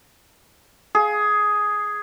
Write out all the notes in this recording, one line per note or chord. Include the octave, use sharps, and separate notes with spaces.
G#4